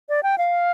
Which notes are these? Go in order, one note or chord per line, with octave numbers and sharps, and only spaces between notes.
D5
G5
F5